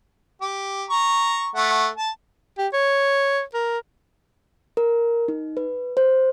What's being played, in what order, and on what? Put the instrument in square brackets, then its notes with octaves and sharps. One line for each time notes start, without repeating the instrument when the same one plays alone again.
[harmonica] G4
A#5 C#6
A3 F#5
A5
[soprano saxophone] G4
C#5
A#4
[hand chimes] A#4
D#4
B4
C5